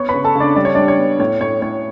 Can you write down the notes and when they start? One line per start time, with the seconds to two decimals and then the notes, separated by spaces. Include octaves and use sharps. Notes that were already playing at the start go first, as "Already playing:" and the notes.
Already playing: B3 C#5 C#6
0.09 C#3 B4 B5
0.24 A4 A5
0.35 C#3
0.40 D4 D5
0.56 G3 D5
0.65 C#5
0.75 G3 D4 D5
0.88 C#5
0.99 B3
1.19 A2 C#5
1.41 A2 C#5
1.62 A2 C#5